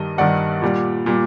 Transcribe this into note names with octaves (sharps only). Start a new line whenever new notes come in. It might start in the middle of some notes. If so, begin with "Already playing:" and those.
Already playing: G2 D#3 G3 D#5
G2 D#3 G3 D5 F#5
A#2 G3
A#2 G3